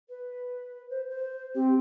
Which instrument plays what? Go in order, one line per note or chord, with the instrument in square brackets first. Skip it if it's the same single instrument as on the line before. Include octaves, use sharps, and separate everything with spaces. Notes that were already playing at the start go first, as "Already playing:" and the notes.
[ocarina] B4
C5
C5
[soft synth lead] C4 [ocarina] G4